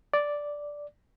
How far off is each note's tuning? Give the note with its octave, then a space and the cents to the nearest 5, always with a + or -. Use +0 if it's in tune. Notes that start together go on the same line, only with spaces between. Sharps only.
D5 -5